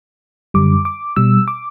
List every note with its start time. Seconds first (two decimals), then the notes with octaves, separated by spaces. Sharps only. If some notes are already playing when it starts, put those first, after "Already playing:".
0.54 F#2 D3 G3 D6
0.85 D6
1.16 B2 G3 E6
1.48 D6